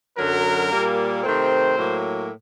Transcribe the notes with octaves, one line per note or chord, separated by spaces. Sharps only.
F#2 D3 F#3 A#4
A#2 G3 A#3
C3 D#3 A3 C4 C5
A2 F#3 A#3